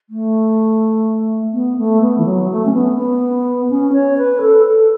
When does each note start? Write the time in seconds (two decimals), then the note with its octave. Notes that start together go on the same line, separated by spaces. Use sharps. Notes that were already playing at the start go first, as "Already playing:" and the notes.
0.10 A3
1.53 B3
1.77 A3
2.02 B3
2.18 E3
2.25 F#3
2.50 A3
2.66 C#4
2.74 B3
2.97 B3
3.70 C#4
3.93 C#5
4.17 B4
4.41 A4
4.65 A4